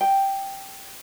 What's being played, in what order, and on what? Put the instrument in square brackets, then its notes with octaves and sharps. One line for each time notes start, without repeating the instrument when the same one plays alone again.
[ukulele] G5